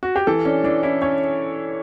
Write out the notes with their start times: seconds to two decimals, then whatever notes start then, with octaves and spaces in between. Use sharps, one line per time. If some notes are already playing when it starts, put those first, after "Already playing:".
0.03 F#4
0.16 G4
0.27 E3 A4
0.45 C#4 D4
0.64 E3 D4
0.83 C#4 E4
1.02 C#4 C#5